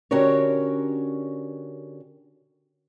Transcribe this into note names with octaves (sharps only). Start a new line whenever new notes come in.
D3 C#4 F#4 G4 A#4 C#5